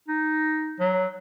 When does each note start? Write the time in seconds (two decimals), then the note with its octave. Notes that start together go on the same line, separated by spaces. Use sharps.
0.08 D#4
0.80 F#3